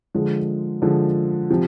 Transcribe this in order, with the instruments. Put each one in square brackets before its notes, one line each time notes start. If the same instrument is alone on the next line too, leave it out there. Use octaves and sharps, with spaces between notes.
[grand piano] D3 F3 G#3
D3 F3 G#3
C3 F3